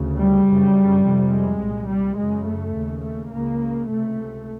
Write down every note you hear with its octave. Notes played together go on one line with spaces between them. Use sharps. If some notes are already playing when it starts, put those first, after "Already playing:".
Already playing: D2 C#3
G3
F#2 C#3
F2 C3
G#3
C2 A#2
G3
F#2 C#3 G#3
A3
D#2 C#3
A3
C#2 C#3 A#3
C#2 C3 A3